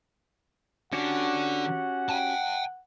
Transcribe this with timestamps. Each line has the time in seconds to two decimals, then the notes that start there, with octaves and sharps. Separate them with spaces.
0.93 D3 C#4 F#4 G4 F#5
2.10 G5 A5